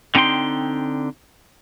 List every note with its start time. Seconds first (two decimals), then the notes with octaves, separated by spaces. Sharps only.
0.15 D3 C4 D#4 G5 C6